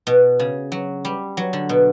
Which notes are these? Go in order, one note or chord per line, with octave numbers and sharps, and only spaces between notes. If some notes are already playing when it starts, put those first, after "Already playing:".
B2
C#3
F#3
G3
F#3
D3
B2